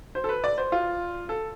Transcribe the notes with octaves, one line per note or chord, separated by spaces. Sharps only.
C5
A4
B4
D5
C5
F4
A4